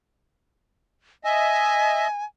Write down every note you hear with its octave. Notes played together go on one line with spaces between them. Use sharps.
D#5 E5 G#5